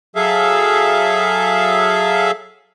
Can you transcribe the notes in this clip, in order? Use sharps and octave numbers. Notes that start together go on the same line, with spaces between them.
F#3 G#4 A4 E5 F5